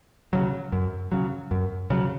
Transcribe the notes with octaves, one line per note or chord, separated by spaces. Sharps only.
C#3 F#3
F#2
C#3 F#3
F#2
C#3 F#3